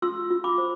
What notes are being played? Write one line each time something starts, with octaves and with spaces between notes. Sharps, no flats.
F4 C6 E6
F4
B5 D6
C5